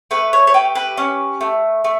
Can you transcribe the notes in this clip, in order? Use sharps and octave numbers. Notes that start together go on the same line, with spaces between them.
A3 B4
C#5
C#5
G4 B4
B4
C#4
A3
A3